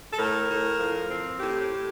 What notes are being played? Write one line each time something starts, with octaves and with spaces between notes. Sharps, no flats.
A4
A2 A#4
A2
F3
C4
A2 G4
A2